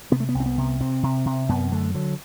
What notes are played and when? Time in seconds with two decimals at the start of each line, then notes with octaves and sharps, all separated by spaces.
0.12 C3 B3
0.20 A3
0.29 B3
0.35 C2
0.40 C4
0.46 B3
0.58 C3
0.81 C3 C4
1.03 C3
1.26 C3
1.49 F#2 B3
1.72 D3 A3
1.95 D3 F#3